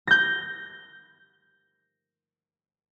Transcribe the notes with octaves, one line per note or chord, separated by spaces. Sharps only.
G6 A#6